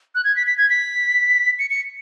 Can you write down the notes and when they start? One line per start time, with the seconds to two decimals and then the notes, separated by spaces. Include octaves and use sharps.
0.15 F#6
0.25 G#6
0.36 B6
0.47 B6
0.58 G#6
0.70 B6
1.59 C#7
1.70 C#7